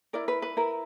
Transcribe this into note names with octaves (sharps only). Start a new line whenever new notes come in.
E4 A#4 D5
B4
B4
E4 A#4